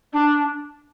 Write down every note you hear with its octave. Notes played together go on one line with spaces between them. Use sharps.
D4